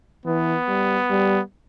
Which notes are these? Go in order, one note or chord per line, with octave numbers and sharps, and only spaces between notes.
E3 B3
G3
G3